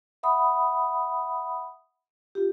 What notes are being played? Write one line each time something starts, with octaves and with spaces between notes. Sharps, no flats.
E5 F#5 B5 D#6
F4 G4